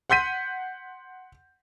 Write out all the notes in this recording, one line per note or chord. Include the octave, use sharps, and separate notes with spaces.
F#5 C6 G6 B6 D#7